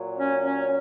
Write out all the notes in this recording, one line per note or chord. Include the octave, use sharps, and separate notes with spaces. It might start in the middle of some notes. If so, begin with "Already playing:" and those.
Already playing: A#2 F#3
C#4 C#5
C#4 C#5